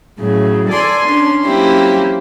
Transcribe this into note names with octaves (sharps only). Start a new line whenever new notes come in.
A2 C#3 F#3
A4 D5 G#5 C6
C#4 D4 C6
F#3 A#3 C4 C#4 E4 G4